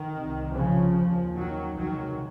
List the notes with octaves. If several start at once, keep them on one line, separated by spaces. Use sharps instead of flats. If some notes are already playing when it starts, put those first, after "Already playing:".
Already playing: D#3
C2 C3
C#3 F3
D#2 C#3
D#3 F#3
C#2 C3 D#3 F#3